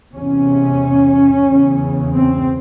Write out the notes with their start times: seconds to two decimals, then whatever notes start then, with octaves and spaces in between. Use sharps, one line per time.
0.14 E2 C3 C#4
1.48 E2 C#3
2.14 C4